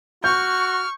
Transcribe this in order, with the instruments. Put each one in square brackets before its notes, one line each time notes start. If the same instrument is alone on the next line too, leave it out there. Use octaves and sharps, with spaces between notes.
[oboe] F#4 [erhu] C#6 [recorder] F6 [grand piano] G6